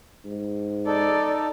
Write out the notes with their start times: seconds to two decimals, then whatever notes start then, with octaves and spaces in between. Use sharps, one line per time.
0.25 G#2
0.86 D#4 A4 D5